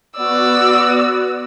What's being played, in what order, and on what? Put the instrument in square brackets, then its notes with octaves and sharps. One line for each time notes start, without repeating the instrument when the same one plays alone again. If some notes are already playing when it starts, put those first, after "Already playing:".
[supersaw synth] B3 F#4 [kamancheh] D5 E6